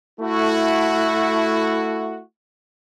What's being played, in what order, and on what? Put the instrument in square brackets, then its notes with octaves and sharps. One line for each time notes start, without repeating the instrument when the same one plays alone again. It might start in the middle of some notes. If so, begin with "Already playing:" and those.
[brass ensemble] A3 E4 F#4